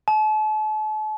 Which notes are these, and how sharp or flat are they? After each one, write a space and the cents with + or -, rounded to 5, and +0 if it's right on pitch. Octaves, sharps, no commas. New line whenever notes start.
A5 -40